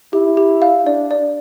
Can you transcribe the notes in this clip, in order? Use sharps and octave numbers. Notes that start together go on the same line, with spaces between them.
E4 G4
G4
F5
D4 D5
D5